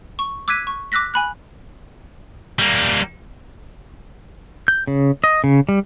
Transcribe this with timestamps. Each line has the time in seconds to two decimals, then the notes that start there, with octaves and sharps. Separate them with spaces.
0.19 C#6
0.48 D6 E6 F#6 G#6 B6 D#7
0.67 C#6
0.92 D6 E6 F#6 A#6 B6
1.14 G#5 B5 F#6
2.59 G3 A#3
4.68 G6
4.87 C#3
5.24 D#5
5.44 C#3
5.69 G3